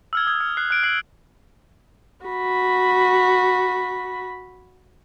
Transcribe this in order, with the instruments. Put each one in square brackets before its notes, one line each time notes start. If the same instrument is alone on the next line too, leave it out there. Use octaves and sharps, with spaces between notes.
[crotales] E6 F6 G#6
D#6 G#6
F6
F#6 C7
F#6 D7
F6 C7 F#7
[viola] F#4 B5